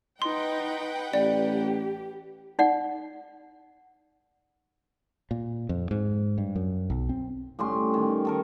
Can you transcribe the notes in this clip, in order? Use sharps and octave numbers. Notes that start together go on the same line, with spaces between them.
D#4 B4 F#5 G5 C6
A1 G4 D5
D#4 D5 F#5
A#2
F2
G#2
G2
F#2
B1
C4
A2 G3 C#4 C6
D#3
D#3 A4 A#4